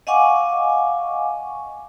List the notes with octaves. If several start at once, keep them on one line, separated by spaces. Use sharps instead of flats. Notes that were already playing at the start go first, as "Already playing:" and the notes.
D#5 F5 F#5 G#5 C#6 D6